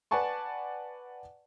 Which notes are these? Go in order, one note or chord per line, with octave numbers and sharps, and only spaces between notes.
B4 D5 F#5 G#5 A5 C#6